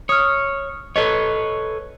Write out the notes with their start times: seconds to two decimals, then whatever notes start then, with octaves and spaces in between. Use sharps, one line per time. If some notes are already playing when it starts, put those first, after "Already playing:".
0.09 C#5 D#6 F6
0.96 A4 B4 C#5 D#5